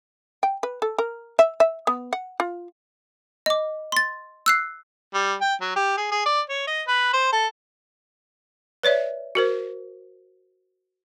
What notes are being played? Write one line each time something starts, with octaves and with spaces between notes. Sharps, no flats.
G5
B4
A4
A#4
E5
E5
B3
F#5
F4
D#5 D6
C6 A6
E6 F#6 C7
G3
G5
F#3
G4
G#4
G#4
D5
C#5
D#5
B4
C5
A4
B4 C#5 D5 E5
F#4 A#4 C5